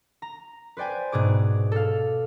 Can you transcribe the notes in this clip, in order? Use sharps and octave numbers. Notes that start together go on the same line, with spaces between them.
A#5
B4 C5 D5 G5 G#5
G#2 B2 G#4 D6
A4 F5